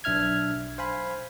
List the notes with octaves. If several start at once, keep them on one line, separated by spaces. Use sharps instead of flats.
B1 D4 E5 F6 G#6
C5 F5 G#5 B5